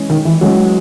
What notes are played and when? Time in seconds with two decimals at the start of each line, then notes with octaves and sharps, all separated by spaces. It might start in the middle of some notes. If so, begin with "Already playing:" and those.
Already playing: E3 G#3 C#4
0.10 D#3
0.25 E3
0.41 E3 F#3 G#3 C#4